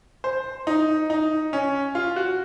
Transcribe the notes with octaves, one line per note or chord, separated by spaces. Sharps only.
C5
D#4
D#4
C#4
F4
F#4